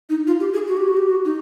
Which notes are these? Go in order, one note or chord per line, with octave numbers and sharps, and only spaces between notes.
D#4
F4
G4
G#4
F#4
G4
F#4
G4
F#4
D#4